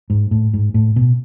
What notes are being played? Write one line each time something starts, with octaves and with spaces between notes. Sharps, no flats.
G#2
A2
G#2
A2
B2